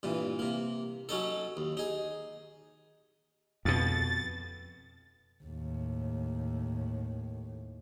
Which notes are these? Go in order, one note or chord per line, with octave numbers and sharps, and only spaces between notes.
G2 A#2 E3
C3 A#3
F#3 C#4 D#4 A4
D#2
D#4 G#4
F2 B2 A6
D#2 A2